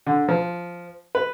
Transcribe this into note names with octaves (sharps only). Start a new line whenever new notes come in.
D3
F3
B4